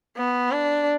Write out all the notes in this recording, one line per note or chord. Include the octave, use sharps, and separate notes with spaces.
B3
D4